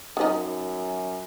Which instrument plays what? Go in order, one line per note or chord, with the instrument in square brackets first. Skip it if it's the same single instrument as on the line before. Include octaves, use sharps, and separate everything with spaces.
[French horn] F#2 [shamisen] D#3 F3 D#4